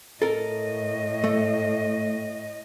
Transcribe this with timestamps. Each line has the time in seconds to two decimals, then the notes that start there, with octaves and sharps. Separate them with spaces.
0.22 A2 A4 A#4 D#5
1.24 A3